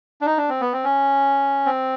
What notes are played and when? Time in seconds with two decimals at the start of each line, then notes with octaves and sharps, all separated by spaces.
0.21 D4
0.26 D#4
0.38 D4
0.49 C4
0.61 B3
0.73 C4
0.84 C#4
1.66 C4